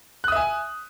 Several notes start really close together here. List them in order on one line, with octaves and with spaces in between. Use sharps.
F#6 D#6 E5 G#5